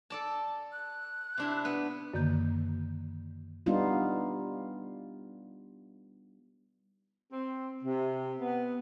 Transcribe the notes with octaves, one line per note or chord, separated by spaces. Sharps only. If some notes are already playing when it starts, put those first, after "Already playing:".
A4 D5 A5
F#6
C3 D4 E4
B3
F#2 D3 D#3 A#3 G6
G3 B3 D4 D#4 F4
C4
C3
B3